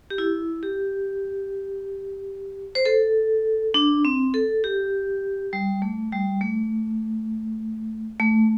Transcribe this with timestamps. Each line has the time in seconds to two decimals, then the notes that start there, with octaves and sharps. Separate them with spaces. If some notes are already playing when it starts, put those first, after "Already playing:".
0.10 G4
0.18 E4
0.63 G4
2.75 C5
2.85 A4
3.74 D4
4.05 C4
4.34 A4
4.64 G4
5.53 G3
5.82 A3
6.12 G3
6.41 A3
8.20 A3